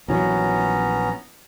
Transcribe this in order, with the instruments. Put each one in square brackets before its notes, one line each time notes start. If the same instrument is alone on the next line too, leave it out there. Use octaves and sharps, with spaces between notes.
[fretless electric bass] A#1 E3 F#3 [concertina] B3 C#4 A#5